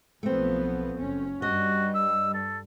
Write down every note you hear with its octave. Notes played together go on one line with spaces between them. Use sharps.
B1 F3 A3 B3 C4
F#1 C#4
G2 G3 F#4 D#5
E6
A4